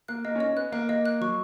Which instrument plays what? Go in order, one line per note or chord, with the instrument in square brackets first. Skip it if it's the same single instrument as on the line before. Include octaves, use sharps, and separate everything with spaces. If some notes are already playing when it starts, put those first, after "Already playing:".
[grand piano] A#3 [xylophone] F#6
[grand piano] A#3 [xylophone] D#5
[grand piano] C#4
[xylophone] D#5
[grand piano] C#4
[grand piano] B3 [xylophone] F#6
[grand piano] A#3 [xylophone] F#6
[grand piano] A#3 [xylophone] D#5
[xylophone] F#6
[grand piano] F#3 [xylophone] C#6